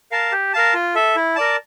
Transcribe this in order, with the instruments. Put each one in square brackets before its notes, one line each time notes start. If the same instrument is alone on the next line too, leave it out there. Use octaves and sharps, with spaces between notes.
[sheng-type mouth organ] A#4 F5 A5
G4
A#4 F5 A5
F4
A4 E5
E4
A#4 D5 A5